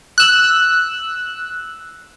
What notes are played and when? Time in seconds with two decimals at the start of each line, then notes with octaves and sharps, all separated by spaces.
0.18 E6 F#6